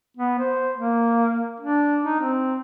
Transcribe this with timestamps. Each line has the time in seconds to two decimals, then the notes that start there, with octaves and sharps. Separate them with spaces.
0.17 B3
0.39 C5
0.77 A#3
1.60 D4
2.04 D#4
2.20 C4